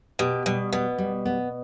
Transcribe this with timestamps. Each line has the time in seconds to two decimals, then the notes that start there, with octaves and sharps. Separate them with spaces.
0.19 B2 G4
0.46 B2 G3
0.73 B2 B3
0.98 G3
1.25 B3